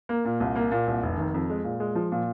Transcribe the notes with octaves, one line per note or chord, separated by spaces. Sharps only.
A#3
A#2
C2
A#3
A#2
C2
F1
D#3
F2
G#3
A#2
G#3
F3
A#2